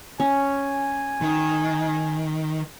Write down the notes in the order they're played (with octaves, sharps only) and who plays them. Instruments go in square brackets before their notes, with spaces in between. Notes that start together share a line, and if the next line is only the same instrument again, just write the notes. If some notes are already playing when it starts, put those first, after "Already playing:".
[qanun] C#4 [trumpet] G#5
[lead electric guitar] D#3